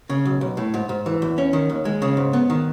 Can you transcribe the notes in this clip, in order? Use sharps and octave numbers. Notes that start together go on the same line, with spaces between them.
C#3
B1
B1
A2
G#2
G#2
E3
E2
C#4
D#3
D#2
G#3
C#3
G#2
B3
D#3